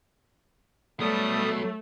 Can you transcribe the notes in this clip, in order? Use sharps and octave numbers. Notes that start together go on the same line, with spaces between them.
F#3 G3 A3 B3 D#6